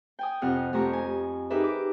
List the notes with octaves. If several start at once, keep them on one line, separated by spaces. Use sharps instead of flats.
G5 G#5 D#6
F2 C3 F#5 F6 G6
F2 A3 G4 G#5 A#5 C#6
G#5
D#4 G4 G#4 A#4 B4 E5
D6